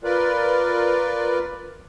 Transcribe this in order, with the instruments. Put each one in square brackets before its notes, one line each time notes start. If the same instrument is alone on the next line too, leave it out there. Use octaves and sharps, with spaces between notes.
[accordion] F4 A#4 B4 D5